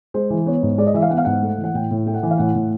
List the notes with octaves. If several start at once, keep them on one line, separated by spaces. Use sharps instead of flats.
G#3 C5
E3
B3 C#5
G#2
G#3 D5
D#5
E3 E5
F5
B3 F#5
F5
G#2 F#5
A3
E3
F#5
A2 G5
A2
A3 G5
F#5
E3
F5
A2 F#5
A2